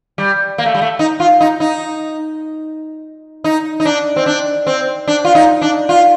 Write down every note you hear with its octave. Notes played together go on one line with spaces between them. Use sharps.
G3
A#3
A3
G3
A3
D#4
F4
D#4
D#4
D#4
D#4
D4
C4
D4
C4
D4
F4
D#4
D4
F4